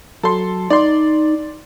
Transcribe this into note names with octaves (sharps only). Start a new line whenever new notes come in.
F#3 A4 C6
D#4 D5 C6